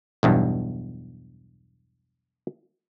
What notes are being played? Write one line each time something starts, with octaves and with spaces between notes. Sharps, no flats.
B1 E2 G2